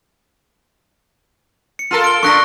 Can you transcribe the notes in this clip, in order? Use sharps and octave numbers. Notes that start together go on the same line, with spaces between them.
C#7
F4 A4 A#4
D7 G7
A#2 D4 C#6 F#6 A#6